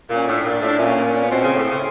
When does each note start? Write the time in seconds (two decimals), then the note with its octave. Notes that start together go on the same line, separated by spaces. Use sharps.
0.10 A#2 C#4
0.27 A2 D4
0.44 A#2
0.61 A2
0.68 D4
0.78 A#2 C#4
1.04 C#4
1.22 B3
1.31 B2 C4
1.43 C#3
1.56 A2
1.69 C#3